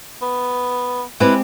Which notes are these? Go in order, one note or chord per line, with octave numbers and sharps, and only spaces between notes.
B3
G#3 C4 E4 G4 B4